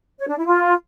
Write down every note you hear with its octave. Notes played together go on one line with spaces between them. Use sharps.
C#5
D4
E4
F4